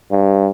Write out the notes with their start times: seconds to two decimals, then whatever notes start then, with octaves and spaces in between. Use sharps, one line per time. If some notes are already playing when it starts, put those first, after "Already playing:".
0.11 G2